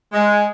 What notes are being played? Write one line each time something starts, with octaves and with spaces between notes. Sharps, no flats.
G#3